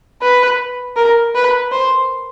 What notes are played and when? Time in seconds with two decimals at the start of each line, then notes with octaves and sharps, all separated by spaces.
0.22 B4
0.97 A#4
1.35 B4
1.72 C5